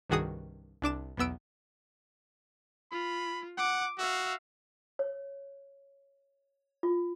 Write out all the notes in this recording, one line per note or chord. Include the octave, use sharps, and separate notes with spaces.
C2 G2 D#3 F#4 G#4 D#6
C2 D4 D6 E7
B1 E2 B3 E6 D7
F4 B5
F#5 D6
F#4 E5 F5
C#5
F4